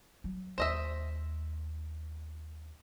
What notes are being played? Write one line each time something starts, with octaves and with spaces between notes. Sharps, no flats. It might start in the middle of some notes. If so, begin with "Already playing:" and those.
F#3
D#2 C5 D#5 E5